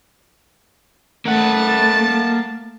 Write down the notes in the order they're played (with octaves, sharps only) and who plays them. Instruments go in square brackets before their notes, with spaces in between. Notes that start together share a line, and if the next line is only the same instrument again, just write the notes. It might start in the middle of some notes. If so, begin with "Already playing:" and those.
[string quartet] A3 A5 [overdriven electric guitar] A#3 F#5